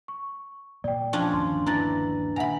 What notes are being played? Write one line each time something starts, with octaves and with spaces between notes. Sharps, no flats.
C#6
A#2 A#3 D5 G5
F3 C#4 D4
G1 D#2 C6
E3 D4 A#5 A6 A#6
A#2 D#3 E5 F#5 G#5 A#5 B5